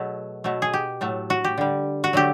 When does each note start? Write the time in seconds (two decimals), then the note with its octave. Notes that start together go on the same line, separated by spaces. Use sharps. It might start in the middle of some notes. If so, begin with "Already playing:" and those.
Already playing: B2 F#3 A3 G#4
0.44 B2 F#3 A3
0.62 G#4
0.73 G4
1.01 A2 F#3 A3
1.30 F#4
1.44 G4
1.58 D3 G3
2.04 F#4
2.13 D3 F#3 A3 G4